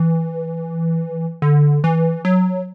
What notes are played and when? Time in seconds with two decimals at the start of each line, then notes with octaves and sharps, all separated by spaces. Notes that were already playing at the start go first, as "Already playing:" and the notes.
Already playing: E3
1.42 D3
1.84 E3
2.25 F#3